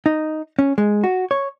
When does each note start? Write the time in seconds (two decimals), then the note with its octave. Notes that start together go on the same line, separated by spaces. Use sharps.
0.06 D#4
0.59 C#4
0.78 G#3
1.04 F#4
1.31 C#5